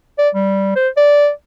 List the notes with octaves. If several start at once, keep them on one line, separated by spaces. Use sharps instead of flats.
D5
G3
C5
D5